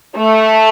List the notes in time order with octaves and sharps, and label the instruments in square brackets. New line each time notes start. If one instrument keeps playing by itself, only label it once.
[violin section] A3